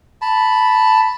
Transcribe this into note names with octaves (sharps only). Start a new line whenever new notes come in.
A5 B5